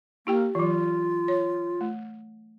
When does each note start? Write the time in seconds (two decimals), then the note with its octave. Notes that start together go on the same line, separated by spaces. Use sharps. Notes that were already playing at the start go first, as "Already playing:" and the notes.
0.27 A#3 E4 G4 G5
0.55 E3 F#3 F4
1.28 C#5
1.81 A3